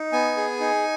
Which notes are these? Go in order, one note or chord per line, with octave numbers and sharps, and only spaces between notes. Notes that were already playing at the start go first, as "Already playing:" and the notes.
Already playing: D#4
B3 G#5
G#4
D#4